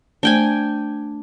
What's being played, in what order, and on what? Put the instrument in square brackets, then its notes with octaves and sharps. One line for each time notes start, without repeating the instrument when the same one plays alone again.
[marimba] A3 C5 [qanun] D4 G5 G#5